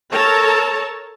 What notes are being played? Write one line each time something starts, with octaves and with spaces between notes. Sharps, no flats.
A4 A#4 C#5 A5 A#5